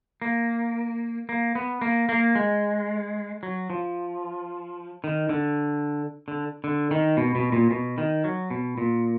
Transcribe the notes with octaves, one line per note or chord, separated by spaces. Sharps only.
A#3
A#3
B3
A#3
A#3
G#3
F#3
F3
D#3
D3
D3
D3
D#3
B2
B2
A#2
B2
D#3
F#3
B2
A#2